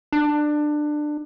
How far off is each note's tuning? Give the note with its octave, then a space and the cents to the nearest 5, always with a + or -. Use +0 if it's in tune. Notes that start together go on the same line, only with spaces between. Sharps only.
D4 +20